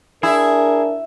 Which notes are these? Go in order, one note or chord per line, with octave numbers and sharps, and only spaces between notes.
D4 E4 G#4 A#4